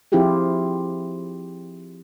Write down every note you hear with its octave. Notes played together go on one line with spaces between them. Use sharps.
F3 C4 E4 F4 G4 G#4